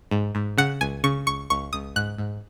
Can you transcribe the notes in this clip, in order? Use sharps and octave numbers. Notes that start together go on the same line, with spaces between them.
G#2
G#2
C#3 F#5
C#2 G#5
C#3 C#6
C#2 C#6
C#2 C#6
C#2 D#6
G#2 F#6
G#2